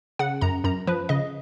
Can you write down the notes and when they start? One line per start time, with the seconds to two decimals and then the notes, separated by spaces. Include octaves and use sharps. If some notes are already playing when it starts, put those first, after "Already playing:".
0.19 C#3 F#5
0.41 F#2 A#5
0.64 F#2 A#5
0.87 F3 B4
1.09 C#3 D#5